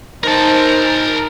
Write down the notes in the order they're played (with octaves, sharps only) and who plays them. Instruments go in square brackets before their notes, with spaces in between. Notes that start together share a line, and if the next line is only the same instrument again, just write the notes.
[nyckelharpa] D#4 C5 [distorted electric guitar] A#4 A5